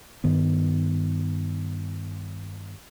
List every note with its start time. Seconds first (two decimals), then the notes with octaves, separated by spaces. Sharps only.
0.24 G2 D#3 B3